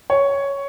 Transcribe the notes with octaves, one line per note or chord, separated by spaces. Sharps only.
C#5